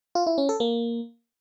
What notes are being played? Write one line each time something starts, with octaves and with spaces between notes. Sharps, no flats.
F4
E4
C#4
A4
A#3